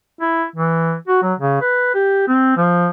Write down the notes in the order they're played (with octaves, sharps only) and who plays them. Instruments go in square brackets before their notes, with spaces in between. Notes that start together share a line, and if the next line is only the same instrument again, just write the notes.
[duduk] E4
E3
F#4
F#3
C#3
B4
G4
C4
F3